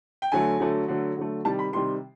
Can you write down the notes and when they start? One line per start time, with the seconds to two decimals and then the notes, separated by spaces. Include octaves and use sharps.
0.22 G5
0.32 D3 F#3 A3 G#5
0.60 D3 F#3 A3
0.88 D3 F#3 A3
1.17 D3 F#3 A3
1.44 C3 D#3 G3 A5
1.59 B5
1.72 C3 D#3 G3 C6